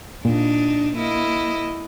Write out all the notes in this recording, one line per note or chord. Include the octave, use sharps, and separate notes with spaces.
A#2 D4 D#4
A#3 E4 D#5